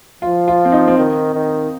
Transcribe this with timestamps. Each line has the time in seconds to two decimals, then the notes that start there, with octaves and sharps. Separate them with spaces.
0.22 F3 F4
0.48 F4
0.65 C4
0.72 D#4
0.88 C4
0.97 D#3 D#4
1.34 D#3